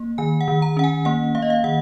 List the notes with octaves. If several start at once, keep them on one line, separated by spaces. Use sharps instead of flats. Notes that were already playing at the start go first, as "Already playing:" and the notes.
Already playing: A#3
D#3 G#5
F#5
D#3
A#5
C#4 F#5
G#5
A#3 F#5
A#3 F5
D#5
F5
D#3 F#5